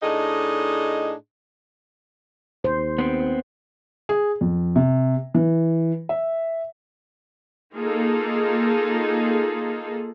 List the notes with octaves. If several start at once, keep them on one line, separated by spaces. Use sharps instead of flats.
A2 D4 D#4 G#4 D#5
D#2 C5
B3 C4
G#4
F2
C3
E3
E5
A#3 D#4 F4 G#4 A4